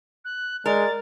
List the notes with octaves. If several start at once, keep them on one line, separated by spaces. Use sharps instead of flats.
F#6
G#3 A#4 D5 A6